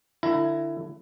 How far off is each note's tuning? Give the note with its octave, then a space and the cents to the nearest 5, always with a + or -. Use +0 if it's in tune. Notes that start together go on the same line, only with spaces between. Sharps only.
D3 +35 E4 +20 A#5 +0